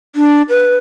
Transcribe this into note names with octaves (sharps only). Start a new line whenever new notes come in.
D4
B4